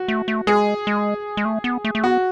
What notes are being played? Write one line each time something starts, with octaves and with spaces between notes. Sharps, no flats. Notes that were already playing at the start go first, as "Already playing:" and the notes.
Already playing: F#4
A3
A3
G#3 G#4
G#3
G#3
A3
B3
A3
A3
B3 F#4